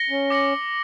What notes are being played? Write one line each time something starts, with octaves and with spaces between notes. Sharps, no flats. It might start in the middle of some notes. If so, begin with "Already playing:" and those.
Already playing: A#6 C#7 G7
C#4
D6 A#6 C#7 F#7